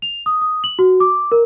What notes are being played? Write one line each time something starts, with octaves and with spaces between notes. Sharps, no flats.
F7
D#6
D#6
F#7
F#4
D6
A#4